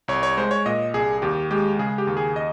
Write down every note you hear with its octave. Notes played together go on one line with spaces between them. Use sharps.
C2 C#5
C#5
G#3 C5
C#5
A#2 D#5
C2 G#4
D#2 G4
G#3 G4
C#3 G#4
G4
D#2
G#4
D#5